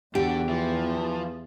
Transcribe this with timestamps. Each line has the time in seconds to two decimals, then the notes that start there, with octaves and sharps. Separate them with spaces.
0.15 E2 D3 F#4 G4
0.49 E3 F3